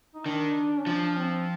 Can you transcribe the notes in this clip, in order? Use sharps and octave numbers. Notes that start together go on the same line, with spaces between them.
D#4
D#3 D4
C#4
F3 D4
C4